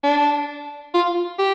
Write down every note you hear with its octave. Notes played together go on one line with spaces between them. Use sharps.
D4
F4
G4